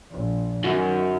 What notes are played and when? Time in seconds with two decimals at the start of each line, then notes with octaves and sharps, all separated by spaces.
0.12 A#1
0.64 F#2 D#3